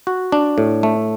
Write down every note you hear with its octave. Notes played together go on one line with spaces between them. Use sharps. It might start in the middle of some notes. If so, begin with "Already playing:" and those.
F#4
D4
A2
A3